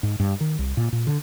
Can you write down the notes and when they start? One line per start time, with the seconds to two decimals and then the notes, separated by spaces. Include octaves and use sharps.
0.03 G#2
0.20 G2
0.41 D#3
0.59 C2
0.77 A#2
0.92 A#2
1.07 D3